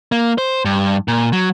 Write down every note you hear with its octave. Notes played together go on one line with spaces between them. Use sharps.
A#3
C5
G2
A#2
F#3